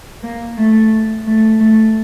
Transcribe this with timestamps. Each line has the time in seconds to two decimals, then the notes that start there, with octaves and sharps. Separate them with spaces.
0.23 A#3
0.57 A3
1.26 A3
1.60 A3